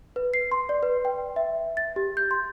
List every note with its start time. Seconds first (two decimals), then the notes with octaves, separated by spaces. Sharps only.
0.16 B4
0.34 C7
0.51 C6
0.69 D5
0.83 B4
1.05 G5
1.36 E5
1.77 A6
1.96 G4
2.17 G6
2.31 C6